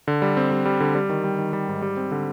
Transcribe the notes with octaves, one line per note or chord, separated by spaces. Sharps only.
D3
G3
C4
G3
G3
D3
G3
D#3
G3
D#3
G3
G#2
G3
C4
D3